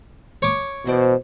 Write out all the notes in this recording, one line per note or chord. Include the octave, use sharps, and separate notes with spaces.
C#5 D6
B2 E3 C5 D5